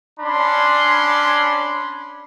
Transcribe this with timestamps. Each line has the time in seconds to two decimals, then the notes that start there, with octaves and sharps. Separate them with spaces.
0.19 C#4 D4 B5 C6